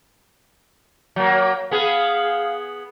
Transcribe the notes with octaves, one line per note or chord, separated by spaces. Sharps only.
F#3 A#3
B3 G#4 F5